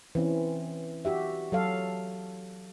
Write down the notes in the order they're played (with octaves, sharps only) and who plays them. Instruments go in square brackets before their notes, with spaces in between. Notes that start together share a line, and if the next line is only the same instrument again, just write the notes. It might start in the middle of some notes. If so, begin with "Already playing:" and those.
[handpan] E3 C4 C#4
F#4 G4 E5
F#3 A4 F5